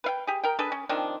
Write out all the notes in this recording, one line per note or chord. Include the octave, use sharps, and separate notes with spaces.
B4 F5 G5
G4 G#4
A#4 G5
D4 G#4 A4 B4
C#4
D#3 F3 C4 D4